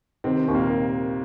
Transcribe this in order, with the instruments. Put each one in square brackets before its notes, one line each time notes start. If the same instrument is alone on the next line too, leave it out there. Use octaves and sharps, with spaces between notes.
[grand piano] C3 C4 [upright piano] D#3
[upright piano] D#2
[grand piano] A#2 A#3